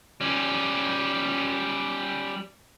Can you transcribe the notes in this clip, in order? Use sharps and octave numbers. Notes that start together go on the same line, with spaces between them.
G3 C#4